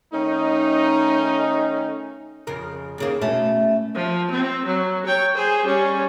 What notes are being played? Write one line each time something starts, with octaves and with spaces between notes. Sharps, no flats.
D#3 A3 C#4 D#4
F2 C#3 A#4
D#2 C#3 A#3
B2 A3 C#4
F3
C4
F#3
C#5 G5
G#4 C5
G3 C#4